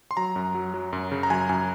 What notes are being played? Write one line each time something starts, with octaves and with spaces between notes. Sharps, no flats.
C6
F#3 A#5
F#2
F#3
F#3
F#2
C#3
A#5
F#2 G#5
F#2 G#5